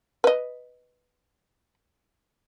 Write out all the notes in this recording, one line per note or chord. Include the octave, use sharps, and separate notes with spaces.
B4 D#5